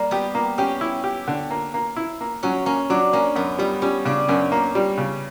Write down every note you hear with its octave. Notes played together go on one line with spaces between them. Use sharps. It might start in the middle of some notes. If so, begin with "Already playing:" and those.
Already playing: G3 A#3
B3 G4
A#3
C#4 G4
E4
G4
D3
A#3
A#3
E4
A#3
F#3 C#4
A#3 C#4
F#3 D4
A#3 C#4
F#2 B3
G3 B3
G3 C#4
C#3 D4
F#2 C#4
A#3
G3
C#3